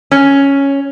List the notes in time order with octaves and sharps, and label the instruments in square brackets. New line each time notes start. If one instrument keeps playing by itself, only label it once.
[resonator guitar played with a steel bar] C#4